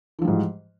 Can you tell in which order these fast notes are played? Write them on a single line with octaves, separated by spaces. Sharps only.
E3 F3 G3 G#2